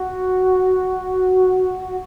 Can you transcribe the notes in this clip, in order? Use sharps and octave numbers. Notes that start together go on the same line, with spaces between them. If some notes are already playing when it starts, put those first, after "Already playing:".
Already playing: F#4